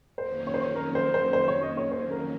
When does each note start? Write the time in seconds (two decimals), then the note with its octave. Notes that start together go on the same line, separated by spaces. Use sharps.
0.18 F2 D#3 F#3 A#3 C#4 C5
0.47 C#5
0.54 C5
0.62 C#5
0.76 A#4
0.95 C5
1.14 C5
1.33 C5
1.48 C#5
1.62 D#5
1.77 C#5
1.92 C5
2.11 A#4